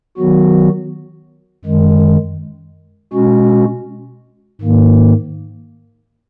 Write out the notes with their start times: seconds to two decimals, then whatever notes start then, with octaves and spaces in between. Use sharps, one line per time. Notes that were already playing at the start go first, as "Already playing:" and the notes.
0.17 D#3 F#3 B3 F#4
1.65 F#2 D#3 G#3
3.13 B2 G#3 C#4 F#4
4.61 G#2 D#3 A#3